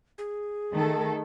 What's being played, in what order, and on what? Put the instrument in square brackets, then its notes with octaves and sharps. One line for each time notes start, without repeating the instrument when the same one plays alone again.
[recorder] G#4
[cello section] D#3 A3 A4